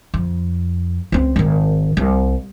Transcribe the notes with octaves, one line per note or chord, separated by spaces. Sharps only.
F2
C#2 C4
G#1 D#3
C2